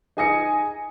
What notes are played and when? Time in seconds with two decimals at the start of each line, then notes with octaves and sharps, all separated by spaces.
0.17 D#4 G#4 G#5 D#6 A#6 C#7